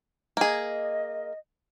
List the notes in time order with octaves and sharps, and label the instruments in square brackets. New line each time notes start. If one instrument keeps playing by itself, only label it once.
[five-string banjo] A#3 G#4 [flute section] D#5